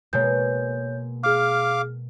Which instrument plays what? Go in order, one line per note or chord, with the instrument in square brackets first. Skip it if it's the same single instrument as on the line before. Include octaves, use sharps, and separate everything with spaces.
[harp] B2 G#3 A#3 [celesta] C#5 G6
[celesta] G#4 F6 [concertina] F5 D6